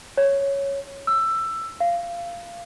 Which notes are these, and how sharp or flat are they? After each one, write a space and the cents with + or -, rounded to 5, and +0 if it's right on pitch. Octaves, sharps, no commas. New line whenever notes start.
C#5 +0
E6 +15
F5 -15